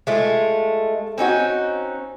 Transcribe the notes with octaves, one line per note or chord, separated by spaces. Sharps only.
G#3 A3 F4
C4 C#4 D#4 F#4